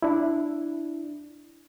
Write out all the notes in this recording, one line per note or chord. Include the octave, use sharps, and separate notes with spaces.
D4 E4